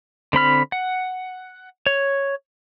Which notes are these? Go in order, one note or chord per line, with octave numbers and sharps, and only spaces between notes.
D3 C4 B5 F6
F#5
C#5